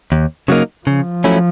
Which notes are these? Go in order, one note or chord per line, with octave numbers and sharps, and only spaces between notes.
D#2
C#3 F#3 A#3 D#4
C#3 F3
F#3 A3 C#4 E4